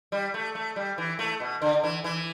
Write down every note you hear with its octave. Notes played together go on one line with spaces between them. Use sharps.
G3
A3
A3
G3
E3
A3
B2
D3
E3
E3